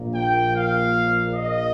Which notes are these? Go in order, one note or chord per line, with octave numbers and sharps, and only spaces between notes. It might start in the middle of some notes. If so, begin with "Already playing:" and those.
Already playing: A#1 A#2 A#3
G5
F5
D#5